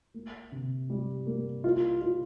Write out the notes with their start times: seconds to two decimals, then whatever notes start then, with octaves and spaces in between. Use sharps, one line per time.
0.14 A#3
0.52 C3
0.90 G3
1.27 A#3
1.64 F4
2.01 F4